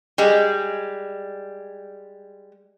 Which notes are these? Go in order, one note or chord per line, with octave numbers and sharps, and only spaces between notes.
G3 G#3